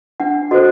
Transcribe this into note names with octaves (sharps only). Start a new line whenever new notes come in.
D4 F#5
F#4 A4 C5 D#5